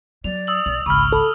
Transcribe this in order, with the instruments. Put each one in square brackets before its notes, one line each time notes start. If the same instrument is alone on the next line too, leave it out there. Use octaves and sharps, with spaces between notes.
[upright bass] F#3 [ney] D5 [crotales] F7
[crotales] D#6 E6 F#7
[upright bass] B1
[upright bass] G#1 C#2 [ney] B5 [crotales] C#6 F6
[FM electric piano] A4 [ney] B5